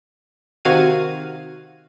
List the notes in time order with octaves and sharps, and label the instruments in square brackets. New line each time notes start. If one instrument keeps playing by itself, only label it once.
[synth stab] C3 D#3 F#4 F5 G#6 D#7